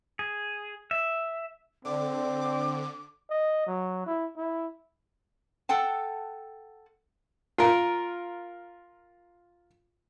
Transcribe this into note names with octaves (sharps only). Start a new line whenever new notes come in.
G#4
E5
D3 C4 D5 D6
D#5
F#3
E4
E4
A4 F#5 G5 A5
F4 A#4